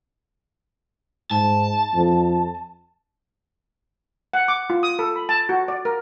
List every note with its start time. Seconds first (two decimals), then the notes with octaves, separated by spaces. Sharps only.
1.31 G#2 A5
1.94 F2
4.33 F#5
4.48 D6
4.70 F4
4.83 D#6
4.99 A4
5.16 B5
5.29 A5
5.49 F#4
5.68 D5
5.85 A#4